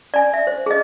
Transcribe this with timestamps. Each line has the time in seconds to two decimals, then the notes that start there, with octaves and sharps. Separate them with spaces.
0.14 D5 G#5
0.34 E5
0.47 C5
0.66 G#4 D#5